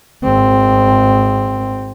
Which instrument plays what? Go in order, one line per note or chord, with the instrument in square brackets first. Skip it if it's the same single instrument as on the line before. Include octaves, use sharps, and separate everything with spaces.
[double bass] G#1 C4